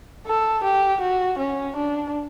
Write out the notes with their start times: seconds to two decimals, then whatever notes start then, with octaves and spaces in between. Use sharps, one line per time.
0.26 A4
0.64 G4
1.01 F#4
1.38 C#4
1.76 D4